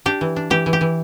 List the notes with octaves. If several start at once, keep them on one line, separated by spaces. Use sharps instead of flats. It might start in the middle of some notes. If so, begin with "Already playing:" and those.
D4 G4
E3
D4
E3 G4
E3
G4
E3